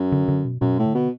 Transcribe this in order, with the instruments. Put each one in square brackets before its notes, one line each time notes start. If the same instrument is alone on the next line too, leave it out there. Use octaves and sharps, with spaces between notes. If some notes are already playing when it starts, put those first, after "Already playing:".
Already playing: [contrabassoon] F#2
[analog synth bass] D3
D3
B2
[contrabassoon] F#2 [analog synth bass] B2
[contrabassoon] A2
[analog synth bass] D3
[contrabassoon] B2